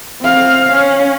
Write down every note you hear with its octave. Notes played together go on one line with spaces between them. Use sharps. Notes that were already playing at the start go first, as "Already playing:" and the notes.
C4 F5
C#4